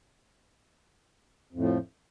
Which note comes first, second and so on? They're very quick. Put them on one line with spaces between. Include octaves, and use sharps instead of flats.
F2 A2 F3